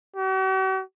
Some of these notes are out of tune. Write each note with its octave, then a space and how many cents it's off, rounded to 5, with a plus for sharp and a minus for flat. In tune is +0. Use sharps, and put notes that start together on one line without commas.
F#4 +45